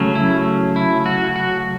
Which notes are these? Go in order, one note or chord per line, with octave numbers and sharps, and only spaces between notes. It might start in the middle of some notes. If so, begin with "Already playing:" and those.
Already playing: C#3 F#3 A3 C#4
E4
E4
F#4
F#4